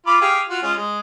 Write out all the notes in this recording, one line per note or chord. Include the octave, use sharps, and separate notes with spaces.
F4 B5 D6
G4 G#4 F5
F4 F#4
G#3 C#4 F4
G#3